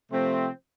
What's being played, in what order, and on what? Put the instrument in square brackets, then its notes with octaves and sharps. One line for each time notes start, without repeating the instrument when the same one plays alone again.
[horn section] C3 F3 A3 C4